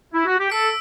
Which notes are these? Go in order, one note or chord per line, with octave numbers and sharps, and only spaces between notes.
E4
F#4
G4
A4 E6 B6 D7